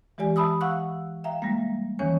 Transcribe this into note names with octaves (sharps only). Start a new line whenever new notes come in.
E3 G#3 G4 D5 G#5
E5 A5 B5 D#6 E6
F5 F#5 C#6 E6 F#6
E5 F5 G5 A#5
G3 G#3 A#3
D#2 D#3 E3 C#4 C#5 G#5